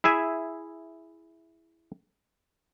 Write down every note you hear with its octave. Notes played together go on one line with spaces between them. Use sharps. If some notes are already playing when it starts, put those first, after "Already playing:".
E4 G#4 E5 G#5